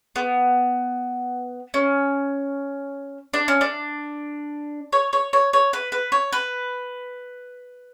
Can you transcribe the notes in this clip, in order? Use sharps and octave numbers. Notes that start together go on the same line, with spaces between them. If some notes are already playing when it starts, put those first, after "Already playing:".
B3
C#4
D4
C#4
D4
C#5
C#5
C#5
C#5
B4
B4
C#5
B4